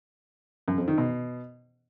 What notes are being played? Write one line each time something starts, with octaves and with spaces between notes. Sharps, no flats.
F#2
F2
D#3
B2